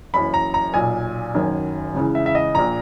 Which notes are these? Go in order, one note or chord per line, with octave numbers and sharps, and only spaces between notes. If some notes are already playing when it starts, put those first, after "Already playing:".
F#1 F#2 E3 B5
A#5
A#5
B1 A#2 G#5
F#1 F#2 D#3
C#2 C#3 E3
E5
E5
D#5
A#1 A#2 A#5